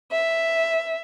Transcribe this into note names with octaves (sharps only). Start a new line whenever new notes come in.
E5